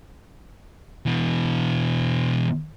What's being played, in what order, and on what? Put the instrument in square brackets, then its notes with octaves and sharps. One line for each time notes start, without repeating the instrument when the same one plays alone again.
[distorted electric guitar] B2 E3